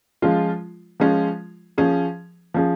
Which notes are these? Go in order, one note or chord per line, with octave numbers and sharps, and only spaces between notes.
F3 G#3 C#4 F4
F3 G#3 C#4 F4
F3 C#4 G#4
F3 C#4 G#4